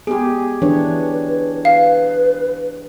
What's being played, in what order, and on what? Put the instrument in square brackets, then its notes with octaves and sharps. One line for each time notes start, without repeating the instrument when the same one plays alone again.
[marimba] B3 [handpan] G4 G#4
[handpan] E3 D4 C#5 [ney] B4
[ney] B4 [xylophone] F5